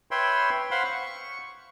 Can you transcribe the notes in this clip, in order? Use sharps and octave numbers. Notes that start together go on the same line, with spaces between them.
B4 C#5 E5 G5 B5 C6
C5 F5 F#5 B5 C6
C#6